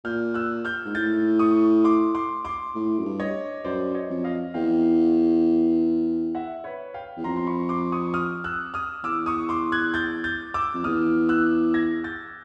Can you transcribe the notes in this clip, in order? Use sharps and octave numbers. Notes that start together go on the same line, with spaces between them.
A#2 F6 G6
E6 F#6
F6 G6
G#2
A2 G6 A6
C#6 D#6
C6 D6
C6 D6
C6 D6
A2
F#2
G2
C#5 D#5
F#2 C5 D5
C#5 D#5
F2
D#5 F5
E2 F5 G5
E5 F#5
B4 C#5
F5 G5
E2
F2 A#5 C6
C6
B5 C#6
C6 D6
C#6 D#6
D#6 F6
E6 F#6
D#6 F6
E2 D6 E6
C#6 D#6
C6 D6
F#6 G#6
G6 A6
G6 A6
D6 E6
F2
E2 D#6 F6
E6 F#6
G#6 A#6
G6 A6